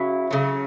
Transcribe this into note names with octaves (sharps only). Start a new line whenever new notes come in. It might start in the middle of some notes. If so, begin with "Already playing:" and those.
Already playing: C#3 F#3 E4
C#3 F#3